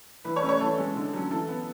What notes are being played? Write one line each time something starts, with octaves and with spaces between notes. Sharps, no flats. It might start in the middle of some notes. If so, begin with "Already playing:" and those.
E3 B4
C#5
A3 C#4
C#5
E3 A4
G#3 C#4
D3
F#3 C#4
E3 A4
B3